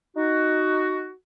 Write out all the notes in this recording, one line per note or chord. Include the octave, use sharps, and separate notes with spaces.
D#4 F#4